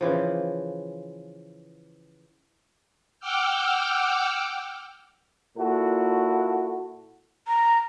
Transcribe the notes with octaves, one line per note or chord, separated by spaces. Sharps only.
C#3 E3 F3
F#5 G5 D6 E6 F6 G6
A#2 E4 F#4 A4
A#5